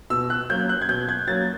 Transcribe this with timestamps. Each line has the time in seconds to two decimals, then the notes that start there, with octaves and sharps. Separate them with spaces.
0.10 B2 E6
0.30 F#6
0.50 F#3 A#3 C#4 G6
0.69 F#6
0.81 G#6
0.88 B2 G6
1.08 G#6
1.27 F#3 A#3 C#4 A6